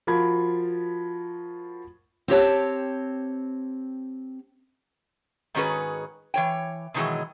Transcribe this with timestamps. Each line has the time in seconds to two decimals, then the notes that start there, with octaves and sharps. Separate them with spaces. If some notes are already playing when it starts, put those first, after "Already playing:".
0.07 F3 F4 F#4 A#4 B5 G#6
2.28 C4 G4 C#5 A5
5.55 G#2 D#3 C#4 F#4 G#4 B4
6.34 E3 C#5 G5
6.94 B2 D#3 E3 F#3 G#3